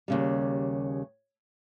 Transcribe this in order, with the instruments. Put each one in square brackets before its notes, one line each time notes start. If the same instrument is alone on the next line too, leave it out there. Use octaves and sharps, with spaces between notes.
[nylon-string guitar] D#2 C#3 G3